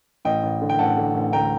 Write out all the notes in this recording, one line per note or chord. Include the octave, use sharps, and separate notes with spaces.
A1 D#5 G5
A1
D3
G5
A1 F#5 A5
D3
A1
D2 G5 A#5